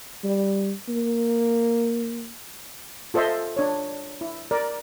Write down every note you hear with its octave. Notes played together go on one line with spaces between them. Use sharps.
G3
A#3
F4 A4 C5 D#5 E5 C6
D4 C#5
E4
A#4 D5